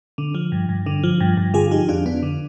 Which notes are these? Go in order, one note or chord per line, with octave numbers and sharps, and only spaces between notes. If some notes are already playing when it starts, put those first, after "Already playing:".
D3
F3
G2
G2
D3
F3
G2
G2
D3 F4 G#4
F3 D#4 G4
F2 D4 F4
F2 B3 D4
D3